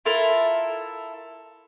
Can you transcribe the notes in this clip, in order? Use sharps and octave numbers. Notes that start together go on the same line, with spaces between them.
E4 F4 A4 A#4